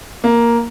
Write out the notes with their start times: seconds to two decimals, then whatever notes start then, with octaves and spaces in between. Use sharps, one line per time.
0.24 A#3